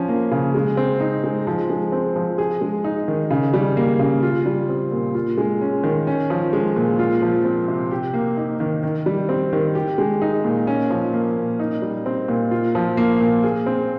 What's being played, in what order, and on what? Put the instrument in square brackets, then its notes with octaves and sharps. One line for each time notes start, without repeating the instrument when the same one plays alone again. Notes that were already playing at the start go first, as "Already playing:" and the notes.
Already playing: [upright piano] F3 C#4
A#3
C#3
G#3
C4
D#4
G#3
F3
G#3
C4
F3
G#4
G#3
D#4
D#3
C#3
G3
A#3
C#3
F4
G3
C4
A#2
F4
G#3
C#4
D#3
C#4
F3
G#3
A#2
F4
F3
C4
C3
G4
A#3
D#4
D#3
D#3
G3
C4
D#3
G4
G#3
D#4
A#2
C#4
F3
A#3
A#2
D#4
G3
C4
A#2
F4
F3
A#3
A#2
G#4
C4